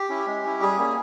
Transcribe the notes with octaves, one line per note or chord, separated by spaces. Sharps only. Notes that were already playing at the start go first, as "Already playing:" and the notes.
Already playing: G4
C#4 E4
G#3
C#4 E4
G3 G#4
A#3 C#4